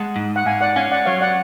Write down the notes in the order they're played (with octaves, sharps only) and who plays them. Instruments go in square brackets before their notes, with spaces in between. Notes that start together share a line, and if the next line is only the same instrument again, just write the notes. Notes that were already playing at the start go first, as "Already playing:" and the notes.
Already playing: [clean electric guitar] G#3 [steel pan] F#5 A5
[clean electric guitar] G#2
[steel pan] F#5
[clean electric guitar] G#2 [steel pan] F5 G#5
[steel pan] D5 F#5
[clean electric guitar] C#4 [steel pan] F5 G#5
[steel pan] D5 F#5
[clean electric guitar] F#3 [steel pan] C#5 F5
[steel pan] D5 F#5